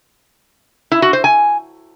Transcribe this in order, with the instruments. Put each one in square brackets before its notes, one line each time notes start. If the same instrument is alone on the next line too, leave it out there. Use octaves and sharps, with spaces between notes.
[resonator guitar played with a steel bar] E4
F#4
C5
G#5